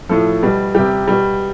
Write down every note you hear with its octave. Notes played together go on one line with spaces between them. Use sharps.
A2 F3 A4
B2 G3
C3 G3 G4
B2 G3